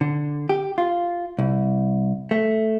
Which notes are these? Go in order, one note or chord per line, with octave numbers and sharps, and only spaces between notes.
D3
G4
F4
C2
A3